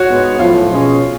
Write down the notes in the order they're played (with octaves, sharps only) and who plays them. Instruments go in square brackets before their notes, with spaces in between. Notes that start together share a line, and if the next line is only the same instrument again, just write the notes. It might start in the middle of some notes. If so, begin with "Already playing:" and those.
Already playing: [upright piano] F#4 C#5
[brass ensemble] G#2 G#3 B3
[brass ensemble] B1 A2 F3 [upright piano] F4
[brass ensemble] B2 G#3 C#4